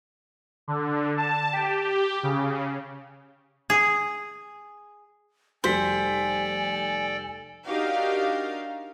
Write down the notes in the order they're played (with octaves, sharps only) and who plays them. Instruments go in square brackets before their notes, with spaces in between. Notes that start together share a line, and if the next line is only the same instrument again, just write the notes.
[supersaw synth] D3
A5
G4
C#3
[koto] G#4
[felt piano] F1 G3 B6 [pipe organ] A4 D5 G5 [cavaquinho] C5 [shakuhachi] G#5
[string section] D4 D#4 F#4 G4 A#4 F5